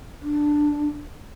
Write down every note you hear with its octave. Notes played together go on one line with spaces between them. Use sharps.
D4